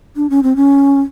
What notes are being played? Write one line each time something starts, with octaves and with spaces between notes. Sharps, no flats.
D4
C#4
C4
C#4